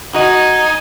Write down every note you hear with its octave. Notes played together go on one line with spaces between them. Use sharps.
D#4 F#4 D#5 G#5